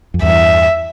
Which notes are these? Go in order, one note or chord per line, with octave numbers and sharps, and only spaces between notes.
F2
E2 G2 E5